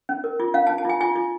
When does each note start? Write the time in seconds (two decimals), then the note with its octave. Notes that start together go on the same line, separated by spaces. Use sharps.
0.09 C#4
0.24 A#4
0.40 F4
0.54 C#4 F5
0.67 A5
0.69 C#4
0.78 A5
0.85 F4 G#5
1.01 F4 G#5
1.16 F4